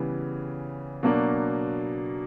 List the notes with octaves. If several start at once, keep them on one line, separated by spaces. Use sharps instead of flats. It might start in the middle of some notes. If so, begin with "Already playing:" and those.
Already playing: C#3 E3 G3 B3
B2 F#3 A#3 D4